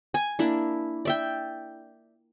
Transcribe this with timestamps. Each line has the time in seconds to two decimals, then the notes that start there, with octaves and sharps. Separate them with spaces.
0.14 G#5
0.39 A#3 D4 E4
1.05 D5 E5 G5